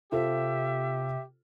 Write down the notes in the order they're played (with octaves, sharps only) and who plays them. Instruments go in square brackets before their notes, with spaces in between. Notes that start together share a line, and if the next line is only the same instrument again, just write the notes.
[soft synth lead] C3 [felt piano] F4 A4 C5 [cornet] G4 [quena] E5